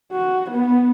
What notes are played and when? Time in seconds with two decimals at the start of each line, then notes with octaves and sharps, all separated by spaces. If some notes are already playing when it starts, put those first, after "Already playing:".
0.12 F#4
0.50 B3